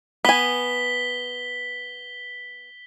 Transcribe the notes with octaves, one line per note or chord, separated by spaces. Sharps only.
B3 G#5 B6 G7